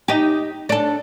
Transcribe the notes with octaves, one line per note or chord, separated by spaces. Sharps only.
D#4 G4
D4 A4